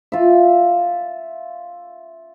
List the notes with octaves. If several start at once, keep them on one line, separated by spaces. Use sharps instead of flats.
F4 E5